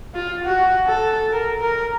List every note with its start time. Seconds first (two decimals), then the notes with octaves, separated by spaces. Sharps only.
0.15 F4
0.44 F#4
0.87 A4
1.32 A#4
1.61 A#4